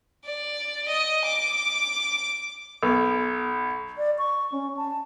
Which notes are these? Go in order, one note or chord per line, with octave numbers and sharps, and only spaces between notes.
D5
D#5
D6
B1
D5
C#6
C#4
A5